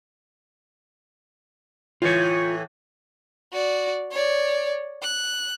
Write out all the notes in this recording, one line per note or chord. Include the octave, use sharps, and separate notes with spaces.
A2 E3 F4 C#5
F#4 D5
C#5 D5
F#6